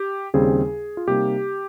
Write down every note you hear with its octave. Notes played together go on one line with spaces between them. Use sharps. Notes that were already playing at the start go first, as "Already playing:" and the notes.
Already playing: G4
D#2 C#3 G3 C4 D#4 G#4
F4
C3 G3 A#3 D#4 G4